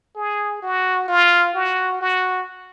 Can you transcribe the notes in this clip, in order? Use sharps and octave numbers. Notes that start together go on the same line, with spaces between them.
G#4
F#4
F4
F#4
F#4